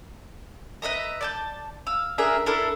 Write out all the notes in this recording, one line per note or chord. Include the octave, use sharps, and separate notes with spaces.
B4 D#5 E5 A#5
D5 A5 G6
F5 E6
D4 G#4 A#4 E5
D4 E4 A4 A#4